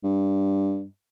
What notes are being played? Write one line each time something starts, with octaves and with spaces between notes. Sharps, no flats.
G2